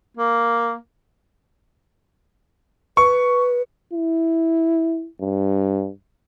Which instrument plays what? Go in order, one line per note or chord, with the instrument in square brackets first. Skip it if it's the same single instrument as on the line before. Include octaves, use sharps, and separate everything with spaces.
[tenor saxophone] A#3
[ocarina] B4 [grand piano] C#6
[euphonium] E4
G2